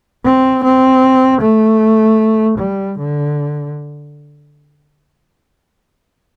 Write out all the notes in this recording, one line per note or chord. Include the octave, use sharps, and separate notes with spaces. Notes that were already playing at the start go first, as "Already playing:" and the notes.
C4
C4
A3
G3
D3